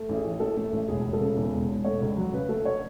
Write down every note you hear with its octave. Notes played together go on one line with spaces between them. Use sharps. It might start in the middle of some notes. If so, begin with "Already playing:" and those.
Already playing: A3
A1
G#4
E3
A2 A4
A3
A1
E1 G#4
E1
A4
C#3
E2
E1
E1
A3 C#5
C#2
F#3
C#3 B4
A3 A4
C#5